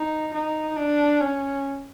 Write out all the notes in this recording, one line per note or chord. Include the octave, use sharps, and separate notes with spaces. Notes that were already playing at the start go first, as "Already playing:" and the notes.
Already playing: D#4
D#4
D4
C#4